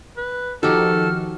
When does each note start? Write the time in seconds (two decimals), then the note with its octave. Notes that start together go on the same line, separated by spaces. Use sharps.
0.17 B4
0.63 D#3 F3 D#4 F#4 G4 A4 F6